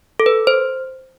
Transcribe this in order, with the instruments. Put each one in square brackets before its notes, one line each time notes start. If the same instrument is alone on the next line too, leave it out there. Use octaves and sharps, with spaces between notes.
[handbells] A4
B4
C5